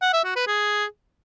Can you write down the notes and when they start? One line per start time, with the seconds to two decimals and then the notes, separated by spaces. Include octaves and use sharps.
0.02 F#5
0.13 E5
0.25 F#4
0.36 B4
0.47 G#4